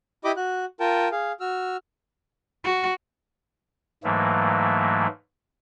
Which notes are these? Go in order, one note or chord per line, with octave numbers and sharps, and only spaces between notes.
E4 G4 D#5 B5 D6
F#4 F#6
F4 A#4 G5 A5
G#4 F5
F#4 E6 F6
F#4
G#2 E3 F#3 A3 A#3